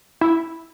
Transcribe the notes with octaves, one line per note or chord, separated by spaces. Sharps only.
E4